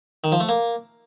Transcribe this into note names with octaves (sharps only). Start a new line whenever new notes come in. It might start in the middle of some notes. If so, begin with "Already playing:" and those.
D#3
F3
A3
A#3